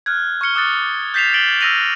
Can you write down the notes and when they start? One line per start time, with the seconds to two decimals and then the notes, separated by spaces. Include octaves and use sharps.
0.06 F6 F#6 G#6
0.41 C#6 F6 C#7 G7
0.55 D6 D#6 F#6 A6 C#7
1.14 G6 A6 B6 C7 E7 F7
1.34 A6 D7 F#7 G7
1.61 E6 F6 A#6 D#7 F7